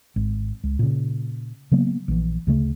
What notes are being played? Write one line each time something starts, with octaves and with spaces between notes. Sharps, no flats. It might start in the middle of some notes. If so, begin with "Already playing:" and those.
G#1
C#2
A#2 C#3
C#3 F#3 A#3 B3
A#1 E3
D2 C#3 A3